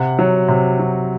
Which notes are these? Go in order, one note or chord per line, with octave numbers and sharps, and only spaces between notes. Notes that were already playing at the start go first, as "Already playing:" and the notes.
Already playing: C3 F#5
F#3
C3
F#3